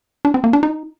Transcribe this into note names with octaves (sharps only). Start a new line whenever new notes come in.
D4
C4
A#3
D4
D#4